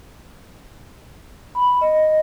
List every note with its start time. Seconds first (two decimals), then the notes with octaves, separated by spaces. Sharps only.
1.55 B5
1.81 D#5